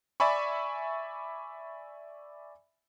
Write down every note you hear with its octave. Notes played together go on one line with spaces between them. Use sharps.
D5 E5 G#5 B5 C#6